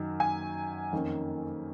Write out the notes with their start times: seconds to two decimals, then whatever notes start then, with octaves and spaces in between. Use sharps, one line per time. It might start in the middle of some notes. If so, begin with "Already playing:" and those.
Already playing: F#2 D#3 F#3
0.20 G#5
0.93 F2 D#3 A#3 C#4